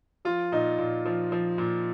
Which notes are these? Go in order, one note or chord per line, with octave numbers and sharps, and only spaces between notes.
F3 F4
A#2 D#4
A#2
F3
F3
A#2